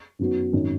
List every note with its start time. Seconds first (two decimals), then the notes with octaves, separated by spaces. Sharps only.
0.19 F#2 D#3 F#3 B3 F#4
0.53 G#1 F#2 D#3